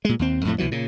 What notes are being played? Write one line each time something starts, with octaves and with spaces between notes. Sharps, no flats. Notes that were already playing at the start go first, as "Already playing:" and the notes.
A#2 G#3
D#2 C4
F2 A2 A3
C2 B2 E3 F#3
A#2 C#3